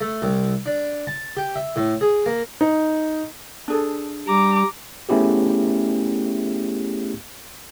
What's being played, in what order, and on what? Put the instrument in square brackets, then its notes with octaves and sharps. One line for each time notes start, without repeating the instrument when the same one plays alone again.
[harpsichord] A3
C2
D4
A5
G4
E5
A2
G#4
A#3
[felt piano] D#4
[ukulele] D4 G#4 A4
[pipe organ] G3 [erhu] A#5 [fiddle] D6
[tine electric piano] A3 B3 C#4 E4 G4 G#4